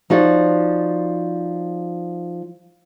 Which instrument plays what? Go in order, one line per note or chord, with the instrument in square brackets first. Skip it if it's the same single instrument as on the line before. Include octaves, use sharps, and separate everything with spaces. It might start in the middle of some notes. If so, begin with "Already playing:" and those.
[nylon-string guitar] F3 D#4 F#4 D5